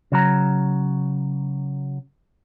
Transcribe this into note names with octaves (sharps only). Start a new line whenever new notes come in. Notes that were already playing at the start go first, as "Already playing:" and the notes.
C#3 F#3 A#5